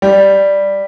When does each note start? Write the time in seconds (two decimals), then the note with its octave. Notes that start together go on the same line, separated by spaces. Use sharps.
0.02 G3